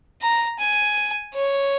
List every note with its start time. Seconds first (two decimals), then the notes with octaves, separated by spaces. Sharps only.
0.22 A#5
0.59 G#5
1.35 C#5